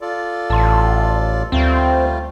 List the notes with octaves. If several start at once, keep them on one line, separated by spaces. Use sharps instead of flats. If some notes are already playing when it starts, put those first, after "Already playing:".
F4 A4 D5
A1 A5 C6
D2 G3 A3 C4 F4